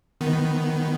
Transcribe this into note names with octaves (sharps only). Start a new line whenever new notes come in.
D#3 B3